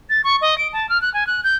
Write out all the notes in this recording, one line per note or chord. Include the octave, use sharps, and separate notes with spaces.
A6
C#6
D#5
D7
A5
F6
F#6
G#5
F#6
G6